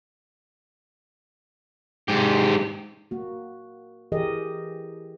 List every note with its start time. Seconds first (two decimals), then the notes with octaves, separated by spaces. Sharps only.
2.08 G#2 G4
3.11 A#3 F#4
4.12 E3 G4 G#4 A#4 D#5